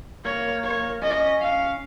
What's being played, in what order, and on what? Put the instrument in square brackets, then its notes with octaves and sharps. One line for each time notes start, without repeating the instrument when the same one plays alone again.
[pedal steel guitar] A#3 [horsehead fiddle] C#5
[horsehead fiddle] C#5
[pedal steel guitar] C#4 [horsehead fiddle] D#5
[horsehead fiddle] F5